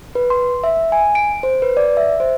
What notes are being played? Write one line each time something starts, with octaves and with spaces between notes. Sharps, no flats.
B4
C6
E5
G#5
D7
C5
B4
D5
E5
C5